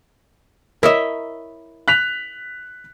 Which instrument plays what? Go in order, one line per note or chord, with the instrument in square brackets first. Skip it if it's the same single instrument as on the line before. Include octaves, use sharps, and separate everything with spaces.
[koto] E4 E5 [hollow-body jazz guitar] A#4 C#5 D#5
[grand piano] F#6 B6 F7